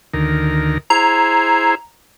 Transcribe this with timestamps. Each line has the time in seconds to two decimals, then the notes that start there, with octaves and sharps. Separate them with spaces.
0.14 D2 D#3 A#4
0.90 E4 G#4 C5 A#5